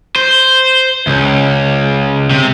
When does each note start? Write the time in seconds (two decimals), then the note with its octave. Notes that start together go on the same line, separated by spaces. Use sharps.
0.16 C5
1.07 C#2
2.30 C3